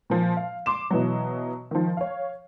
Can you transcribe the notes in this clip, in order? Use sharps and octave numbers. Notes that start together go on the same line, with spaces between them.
A#2 F3
F5
C6 D6 E7
B2 E3 F#3
D#3 F3
C#5 F5